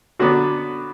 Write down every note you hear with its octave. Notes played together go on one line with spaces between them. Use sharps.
D3 F#3 B3 D4 F#4